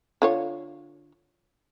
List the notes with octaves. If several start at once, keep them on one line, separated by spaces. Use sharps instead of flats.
D3 F4 C#5